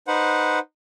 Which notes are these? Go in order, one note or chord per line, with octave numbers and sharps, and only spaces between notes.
D#4 B4 C5 F#5